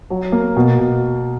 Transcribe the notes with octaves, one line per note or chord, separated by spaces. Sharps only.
F#3
A#3
B2
B2